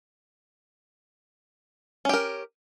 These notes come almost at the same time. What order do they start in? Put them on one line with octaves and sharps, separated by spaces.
C#4 G4 A#4